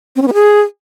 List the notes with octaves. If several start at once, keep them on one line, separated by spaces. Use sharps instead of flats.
C4
C#4
B3
G#4